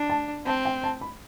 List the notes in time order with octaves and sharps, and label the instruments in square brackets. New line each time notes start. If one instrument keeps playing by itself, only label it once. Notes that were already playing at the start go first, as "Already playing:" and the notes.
Already playing: [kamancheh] D4
[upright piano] A5
[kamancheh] C4 [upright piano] A5
[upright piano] G5
A5
B5